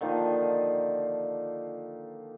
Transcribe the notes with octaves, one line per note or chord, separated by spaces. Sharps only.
D3 D#3 F3 A#3